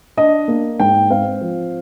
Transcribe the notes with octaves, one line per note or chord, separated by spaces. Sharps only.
D4 D#5
A#3
G#2 G5
C4 F5
F3